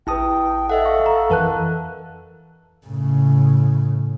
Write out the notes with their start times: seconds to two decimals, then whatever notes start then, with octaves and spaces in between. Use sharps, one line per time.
0.07 A1 E4 B4 G5 A5 D#6
0.69 A4 D#5 E5 F#5
0.85 F5 F#5 C#6
1.06 A#5
1.30 F2 E3 A#4 B4 A5 F#6
2.87 A2 C#3